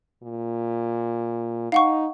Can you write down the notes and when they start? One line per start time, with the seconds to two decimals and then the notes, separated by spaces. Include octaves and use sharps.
0.23 A#2
1.72 D#4 F5 F#5 C#6